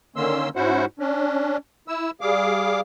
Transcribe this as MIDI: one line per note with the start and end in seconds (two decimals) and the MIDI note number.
0.16 0.49 50
0.16 0.49 51
0.16 0.49 58
0.16 0.49 61
0.16 0.49 84
0.16 0.49 88
0.56 0.85 44
0.56 0.85 61
0.56 0.85 64
0.56 0.85 66
0.56 0.85 72
0.56 0.85 78
0.99 1.57 61
0.99 1.57 62
1.88 2.11 64
1.88 2.11 88
2.21 2.80 55
2.21 2.80 68
2.21 2.80 77
2.21 2.80 86